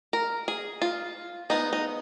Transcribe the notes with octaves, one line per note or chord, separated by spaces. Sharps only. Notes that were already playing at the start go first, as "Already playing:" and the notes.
A#4
G#4
F4
F3 G#3 B3 D#4
D#4